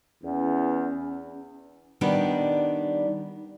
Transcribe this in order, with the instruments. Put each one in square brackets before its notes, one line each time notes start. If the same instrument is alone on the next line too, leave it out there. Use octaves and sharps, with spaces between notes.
[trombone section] E2 [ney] C#4
[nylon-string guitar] D#3 G3 B3 D4 D#4